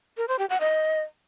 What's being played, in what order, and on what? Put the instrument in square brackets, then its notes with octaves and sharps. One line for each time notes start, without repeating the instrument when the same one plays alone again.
[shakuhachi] A#4
C5
G4
F#5
D#5